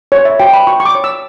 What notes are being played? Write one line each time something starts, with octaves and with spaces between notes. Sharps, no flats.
C#5
E5
F#4 G5
B5
F#4 C#6
C#6
D6
C#5
E6